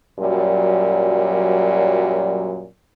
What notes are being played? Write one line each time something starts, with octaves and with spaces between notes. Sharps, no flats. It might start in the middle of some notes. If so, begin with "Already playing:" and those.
F#2 A#2 F#3 G3